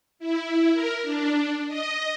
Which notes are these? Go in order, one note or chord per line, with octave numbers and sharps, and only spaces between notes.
E4
A#4
D4
D#5